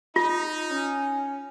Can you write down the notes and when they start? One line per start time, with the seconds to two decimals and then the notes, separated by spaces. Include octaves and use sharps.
0.16 D#4 F4
0.70 C#4